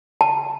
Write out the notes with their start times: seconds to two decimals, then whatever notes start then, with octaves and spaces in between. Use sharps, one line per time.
0.21 A5